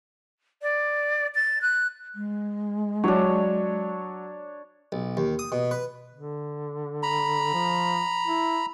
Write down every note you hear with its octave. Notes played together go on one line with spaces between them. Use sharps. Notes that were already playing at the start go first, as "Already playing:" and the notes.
D5
A6
F#6
G#3
F#3 D4 C#5
B1
D#2
D#6
B2
B4
D3
A#5 B5
F3
E4